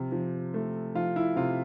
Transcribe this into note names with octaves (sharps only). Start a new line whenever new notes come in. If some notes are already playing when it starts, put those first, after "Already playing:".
Already playing: C3 F3
F3
A3
F3 F4
E4
C3 F4